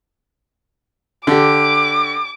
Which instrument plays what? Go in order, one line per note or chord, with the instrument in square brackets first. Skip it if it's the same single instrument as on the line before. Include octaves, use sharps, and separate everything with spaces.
[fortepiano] D3 G4 [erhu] D6